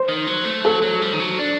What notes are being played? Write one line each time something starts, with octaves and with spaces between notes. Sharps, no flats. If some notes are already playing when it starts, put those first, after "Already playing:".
Already playing: C5
D#3
F#3
A3
F#3 A4
F#3
G3
D#3
F#3
D4